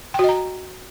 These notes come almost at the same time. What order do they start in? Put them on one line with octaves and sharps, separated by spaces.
G5 F#4 D#5 A#5